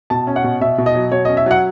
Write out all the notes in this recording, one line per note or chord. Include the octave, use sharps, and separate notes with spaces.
B2 A5
C#4
F#5
B2
B2 E5
B2
D#5
F#3
B2 C#5
C#4 D#5
E5
F#3 F#5